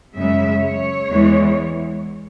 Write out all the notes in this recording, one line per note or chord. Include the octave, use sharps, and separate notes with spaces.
F#2 C#3 G#3 E5
C#5
E2 E3 G#3